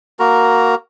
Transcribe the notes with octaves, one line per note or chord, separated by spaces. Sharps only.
A#3 F#4 A#4 A#5